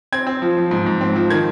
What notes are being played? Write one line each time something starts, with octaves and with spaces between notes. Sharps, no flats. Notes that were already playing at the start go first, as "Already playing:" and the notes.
C4 G#6
C4
F3
F3
G#2
G#2
C4
F3
D#3 G#6